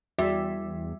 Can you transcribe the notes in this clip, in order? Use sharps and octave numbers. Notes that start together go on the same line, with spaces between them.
E2 G3 F#4 D5 E5